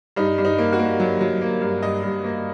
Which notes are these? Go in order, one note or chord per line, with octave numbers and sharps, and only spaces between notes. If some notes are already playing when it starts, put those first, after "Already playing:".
G2 D#4
G2
D#4
A#3
F#4
A#3
F#3
F#3
A#3
G2
G2 D#5
G2
A#3